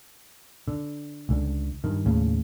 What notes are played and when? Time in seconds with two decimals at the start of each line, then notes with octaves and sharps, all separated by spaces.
0.68 D3
1.29 C#2 D3
1.84 G2 D#3
2.06 D#2 A2 C#3